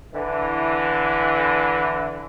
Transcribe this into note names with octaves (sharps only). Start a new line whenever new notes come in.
D3 E3